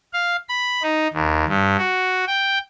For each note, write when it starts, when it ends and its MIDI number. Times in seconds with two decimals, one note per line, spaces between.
0.13 0.36 77
0.49 0.83 83
0.83 1.08 63
1.14 1.45 39
1.49 1.77 43
1.78 2.25 66
2.27 2.59 79